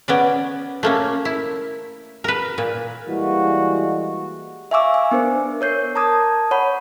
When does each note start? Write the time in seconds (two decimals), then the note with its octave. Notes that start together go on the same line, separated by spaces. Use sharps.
0.08 B3 C#4 D5
0.83 A3 A#3 C#4
1.25 E4
2.24 A#4 B4
2.58 A#2
3.08 E3 G3 G#3 A#3 F#4
4.71 E5 F5 G#5 C#6 D6 E6
4.94 G#5
5.11 B3 D4 A#4 C5
5.61 A#4 C#5 G6 C7
5.95 A5 A#5 D6 D#6 G#6
6.51 C#5 F#5 B5